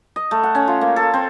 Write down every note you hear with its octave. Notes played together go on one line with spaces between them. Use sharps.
D#5
A3
F#5
C#4
F4
A#3
A4
C4